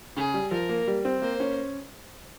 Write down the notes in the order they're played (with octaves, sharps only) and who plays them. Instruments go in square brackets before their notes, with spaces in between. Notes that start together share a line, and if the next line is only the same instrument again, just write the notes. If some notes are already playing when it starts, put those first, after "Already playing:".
[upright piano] C#3 [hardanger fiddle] G#4
[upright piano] G3
[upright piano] F3 [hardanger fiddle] A#4
[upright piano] A#3
G3
C4
[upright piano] A#3 [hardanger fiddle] C5
[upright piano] C#4